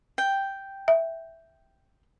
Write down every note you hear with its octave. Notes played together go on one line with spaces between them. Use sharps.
G5
E5